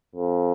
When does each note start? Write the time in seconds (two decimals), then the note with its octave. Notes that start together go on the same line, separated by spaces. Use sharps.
0.15 F2